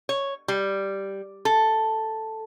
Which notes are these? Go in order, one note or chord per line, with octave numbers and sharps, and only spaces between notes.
C#5
G3
A4